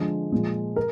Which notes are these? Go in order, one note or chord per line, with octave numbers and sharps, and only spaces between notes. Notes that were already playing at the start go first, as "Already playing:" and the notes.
Already playing: D3 F3 G#3
A#2 F3 G#3
A#4